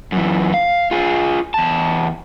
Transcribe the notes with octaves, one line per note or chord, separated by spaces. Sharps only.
F#2 E3
F5
F4 G#4
E2 A5